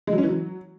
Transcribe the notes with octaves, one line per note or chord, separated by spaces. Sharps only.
G#3
F#3
C#4
E3
F#3